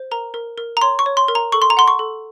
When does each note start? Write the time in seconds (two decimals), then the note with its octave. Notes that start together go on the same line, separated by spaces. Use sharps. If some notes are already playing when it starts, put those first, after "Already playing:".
Already playing: C5
0.11 A#4 A#5
0.34 A#4
0.58 A#4
0.77 A#5
0.82 C#5 C6
0.99 C#6
1.06 C#5
1.17 C6
1.28 A#4
1.35 A#5
1.52 A4 C#6
1.62 C6
1.70 A#5
1.77 F#5 C6
1.88 C#6
1.99 A4